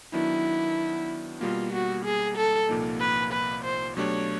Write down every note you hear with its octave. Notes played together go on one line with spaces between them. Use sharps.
D#3 F#3 B3 D4 E4
B2 G3 A#3 F4
F#4
G#4
A4
C2 A#2 F3 A#3 D#4
B4
B4
C5
B2 F#3 A3 D4 G4 C#5